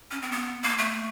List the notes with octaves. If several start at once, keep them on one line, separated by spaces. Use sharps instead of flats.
C#4
C4
B3
A#3
A3